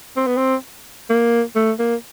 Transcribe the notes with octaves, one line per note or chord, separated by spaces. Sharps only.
C4
B3
C4
A#3
A3
A#3